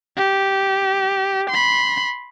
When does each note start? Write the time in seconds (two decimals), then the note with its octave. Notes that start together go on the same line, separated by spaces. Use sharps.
0.17 G4
1.50 B5 C6